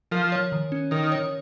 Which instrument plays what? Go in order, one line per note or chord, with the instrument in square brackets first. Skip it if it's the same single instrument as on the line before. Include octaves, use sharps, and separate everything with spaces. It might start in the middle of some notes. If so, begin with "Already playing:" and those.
[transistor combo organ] F3 [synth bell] A#4
[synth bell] C#5
D#3
C#4
[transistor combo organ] D#3 [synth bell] A#4
[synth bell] C#5